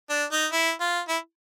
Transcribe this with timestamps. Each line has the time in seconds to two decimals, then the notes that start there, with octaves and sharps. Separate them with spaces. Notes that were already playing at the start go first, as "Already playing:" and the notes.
0.10 D4
0.32 D#4
0.52 E4
0.80 F4
1.08 E4